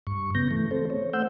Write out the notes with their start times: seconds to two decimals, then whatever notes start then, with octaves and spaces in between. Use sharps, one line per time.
0.07 G2 C#6
0.35 C#3 B3 G6 A#6
0.51 E3 A3
0.71 C4 A4 C5
0.90 C#5
1.13 A3 C5 F#5 E6 G6